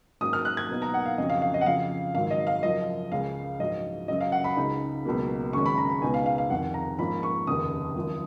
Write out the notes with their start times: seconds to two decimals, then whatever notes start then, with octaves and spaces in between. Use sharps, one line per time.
0.21 G#2 F#3 A#3 C#4 D#6
0.33 F6
0.45 F#6
0.57 G#6
0.69 B1 B2 A#3 D#4
0.82 A#5
0.94 F#5
1.06 F5
1.18 F2 C#3 F#3 C#4 D#5
1.30 F5
1.42 F5
1.54 D#5
1.61 F#5
1.66 F2 C#3 F3 F5
2.14 G#1 G#2 F#3 F5
2.31 D#5
2.47 F5
2.63 F#1 F#2 F3 D#5
3.11 C#2 C#3 G#3 C#4 F5
3.60 A#1 G#2 F#3 D#5
4.08 F#2 C#3 F#3 D#5
4.21 F5
4.32 F#5
4.44 B5
4.57 C#2 C#3 G#3 D#4
5.05 C#2 B2 F#3 A#3
5.53 G#1 F#2 C#3 G#3 C#4 C#6
5.66 B5
5.78 A#5
5.90 B5
6.02 C#2 B2 G#3 B3 D#4 G#5
6.14 F5
6.26 F5
6.38 F5
6.50 F1 F2 D#3 F#5
6.74 A#5
6.99 A#1 G#2 F3 A#3 C#4 B5
7.23 C#6
7.47 F1 D#2 C#3 D#6
7.95 G#1 F#2 F3